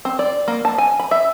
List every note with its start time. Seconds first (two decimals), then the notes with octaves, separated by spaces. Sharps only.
0.05 C4
0.19 D5
0.48 A#3
0.65 A5
0.78 G#5
1.00 B5
1.11 E5